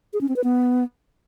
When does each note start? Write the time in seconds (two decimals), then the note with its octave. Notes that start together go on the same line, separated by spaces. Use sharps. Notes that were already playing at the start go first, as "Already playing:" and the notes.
0.13 G#4
0.21 C#4
0.29 C4
0.36 B4
0.44 B3